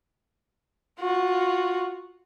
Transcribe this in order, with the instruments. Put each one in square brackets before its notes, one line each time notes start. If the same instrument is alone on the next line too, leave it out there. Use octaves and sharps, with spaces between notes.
[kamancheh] F4 F#4